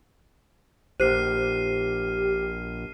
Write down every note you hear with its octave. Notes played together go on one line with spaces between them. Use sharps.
A#1 G4 C5 F6 C7 D#7